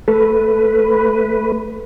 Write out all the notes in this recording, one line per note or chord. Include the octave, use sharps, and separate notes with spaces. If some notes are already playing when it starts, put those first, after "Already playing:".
A3 A4 B4